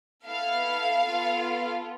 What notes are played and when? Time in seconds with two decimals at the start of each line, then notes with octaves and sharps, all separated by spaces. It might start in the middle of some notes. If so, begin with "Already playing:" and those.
0.25 B3 E4 A4 F5
1.05 B3 F4 A4